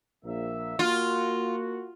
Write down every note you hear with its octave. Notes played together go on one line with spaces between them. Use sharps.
A#1 A#3 E5
A#3 F4 F#4